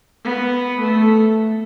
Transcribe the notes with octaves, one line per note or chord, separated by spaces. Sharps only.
B3
A3